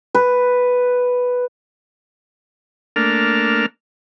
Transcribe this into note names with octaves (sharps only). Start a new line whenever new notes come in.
B4
A3 A#3 D4 F6